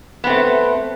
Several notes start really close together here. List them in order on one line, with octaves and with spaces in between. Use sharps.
B3 C4 A3